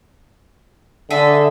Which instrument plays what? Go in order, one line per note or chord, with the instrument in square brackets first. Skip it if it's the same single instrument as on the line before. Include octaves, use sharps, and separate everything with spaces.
[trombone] D3 [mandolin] G#4 A4 E5